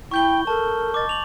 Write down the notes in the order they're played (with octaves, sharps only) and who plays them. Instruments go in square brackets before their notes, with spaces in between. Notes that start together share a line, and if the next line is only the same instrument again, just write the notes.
[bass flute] E4 [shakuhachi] G5 [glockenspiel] C#6 G6 G7
[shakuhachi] A4 [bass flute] A#4 [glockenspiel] A5 C#6
[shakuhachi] D#5 [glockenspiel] D6 A6
[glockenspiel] F7 F#7